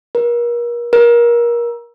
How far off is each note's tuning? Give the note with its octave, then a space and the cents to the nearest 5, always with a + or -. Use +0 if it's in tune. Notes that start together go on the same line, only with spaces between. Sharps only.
A#4 +35
A#4 +25